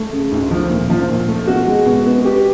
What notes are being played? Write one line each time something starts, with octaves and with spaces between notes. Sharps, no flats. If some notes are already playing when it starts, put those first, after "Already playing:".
Already playing: A3
C#3
D2
F3
A#2
F3
A#2
A3
B2 F#4
G#3
B2
B3
B3 G4